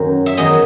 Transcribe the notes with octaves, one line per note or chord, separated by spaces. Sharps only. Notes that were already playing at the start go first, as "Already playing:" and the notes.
Already playing: F#2 D#3 F#3
E5
E2 D#3 F#3 D#5